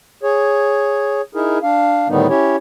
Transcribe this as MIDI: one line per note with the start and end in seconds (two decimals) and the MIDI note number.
0.23 1.21 68
0.23 1.21 73
1.35 1.59 63
1.35 1.59 64
1.35 1.59 68
1.35 1.59 70
1.63 2.08 62
1.63 2.08 77
2.09 2.27 45
2.09 2.27 50
2.09 2.27 51
2.09 2.27 55
2.09 2.27 59
2.09 2.27 63
2.29 2.56 61
2.29 2.56 64
2.29 2.56 67
2.29 2.56 73